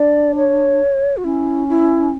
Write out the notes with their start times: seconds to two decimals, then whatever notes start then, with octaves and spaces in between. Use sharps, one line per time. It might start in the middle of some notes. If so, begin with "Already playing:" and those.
Already playing: D4 D5
0.36 C#5
1.17 F#4
1.24 C#4 E4
1.69 E4